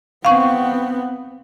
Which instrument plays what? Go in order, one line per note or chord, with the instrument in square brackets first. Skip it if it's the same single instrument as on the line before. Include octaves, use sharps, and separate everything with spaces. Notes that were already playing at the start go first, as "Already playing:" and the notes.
[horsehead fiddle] B3 C4 [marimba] F5 C#6